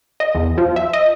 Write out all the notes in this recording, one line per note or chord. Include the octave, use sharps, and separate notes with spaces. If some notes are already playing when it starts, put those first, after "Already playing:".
D#5
E2
F3
E5
D#5